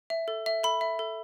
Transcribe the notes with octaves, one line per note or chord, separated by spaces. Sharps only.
E5
A4
E5
A4 B5
E5
A4